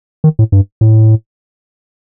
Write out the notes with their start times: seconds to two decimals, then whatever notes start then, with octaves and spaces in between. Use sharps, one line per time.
0.24 D#3
0.39 A2
0.52 G2
0.81 A2